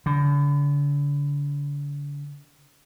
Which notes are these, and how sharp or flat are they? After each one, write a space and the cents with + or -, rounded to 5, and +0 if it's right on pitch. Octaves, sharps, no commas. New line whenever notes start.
D3 -40